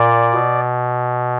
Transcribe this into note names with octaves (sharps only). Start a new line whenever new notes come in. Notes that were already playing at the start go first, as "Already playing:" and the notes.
Already playing: A#2 D5
B2